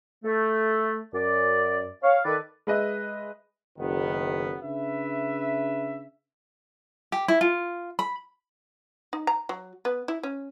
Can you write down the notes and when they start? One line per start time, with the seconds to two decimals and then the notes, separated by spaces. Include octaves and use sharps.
0.24 A3
1.14 F#2 D5
2.03 C#5 F5
2.25 D#3 A4 B4 D5
2.67 G#3 B4 D#5 E5
3.78 F#1 D#3 B3
4.62 C#3 D4 B4 E5
7.12 G4
7.28 E4
7.41 F4
7.99 B5
9.13 D#4
9.27 A#5
9.49 F#3
9.85 B3
10.08 E4
10.23 C#4